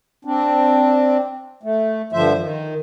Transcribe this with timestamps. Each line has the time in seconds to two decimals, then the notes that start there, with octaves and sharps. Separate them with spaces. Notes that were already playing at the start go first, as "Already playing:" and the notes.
0.25 C4 D4
1.63 A3
2.13 G2 D3 F3 C5 E5
2.40 D#3